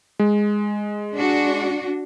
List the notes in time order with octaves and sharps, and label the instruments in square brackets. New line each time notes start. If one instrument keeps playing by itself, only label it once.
[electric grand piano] G#3
[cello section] D4 F#4